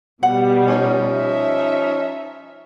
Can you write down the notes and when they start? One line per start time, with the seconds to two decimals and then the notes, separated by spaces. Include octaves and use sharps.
0.23 B2 G3 F#5
0.66 F3 C#4 D#4
1.11 E5